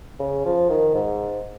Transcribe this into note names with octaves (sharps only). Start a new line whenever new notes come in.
C#3
F3
D#3
G#2